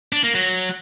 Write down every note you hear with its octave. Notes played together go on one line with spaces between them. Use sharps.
D4
A#3
F#3